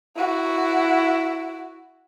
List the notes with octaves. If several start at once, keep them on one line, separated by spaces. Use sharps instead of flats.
E4 F#4